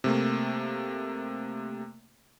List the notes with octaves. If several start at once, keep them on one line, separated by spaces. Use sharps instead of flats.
C3 A3 A#3